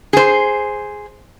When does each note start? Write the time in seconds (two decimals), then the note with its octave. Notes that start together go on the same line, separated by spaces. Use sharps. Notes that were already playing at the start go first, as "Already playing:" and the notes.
0.13 G#4 C5